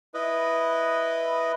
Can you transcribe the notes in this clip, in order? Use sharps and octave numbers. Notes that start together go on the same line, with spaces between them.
E4 B4 D#5